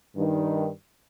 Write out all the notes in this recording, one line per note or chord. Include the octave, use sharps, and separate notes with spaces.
G2 D#3